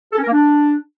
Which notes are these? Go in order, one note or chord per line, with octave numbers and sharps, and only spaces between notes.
A4
C#4
A#4
A#3
D4